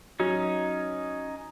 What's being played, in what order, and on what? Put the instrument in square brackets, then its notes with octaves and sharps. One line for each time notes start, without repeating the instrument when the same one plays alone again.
[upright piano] F#3 [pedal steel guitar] C#4 D#4